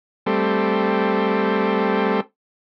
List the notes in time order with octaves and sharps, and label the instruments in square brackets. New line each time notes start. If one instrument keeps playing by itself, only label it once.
[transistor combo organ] G3 A3 C4